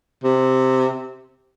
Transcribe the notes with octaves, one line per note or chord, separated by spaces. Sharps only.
C3